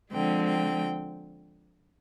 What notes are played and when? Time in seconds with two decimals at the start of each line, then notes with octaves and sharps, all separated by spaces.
0.12 D3 F3 G#3 C4 G5
0.46 G5